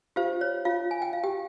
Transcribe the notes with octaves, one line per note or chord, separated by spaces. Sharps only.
F4 G4 C5 F5
C#5
F4 F5
G#5
G5
F5
G4 G5